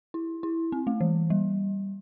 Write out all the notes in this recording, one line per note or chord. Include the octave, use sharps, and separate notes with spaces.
E4
E4
C4
A3
E3
G3